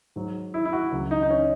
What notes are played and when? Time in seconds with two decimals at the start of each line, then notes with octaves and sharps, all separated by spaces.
0.16 G#2 F#3
0.54 E4
0.65 E4
0.73 F#4
0.92 C#2 C#3 F#3
1.11 D#4
1.23 D#4
1.30 C#4